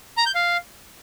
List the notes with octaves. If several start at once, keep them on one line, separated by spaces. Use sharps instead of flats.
A#5
G6
F5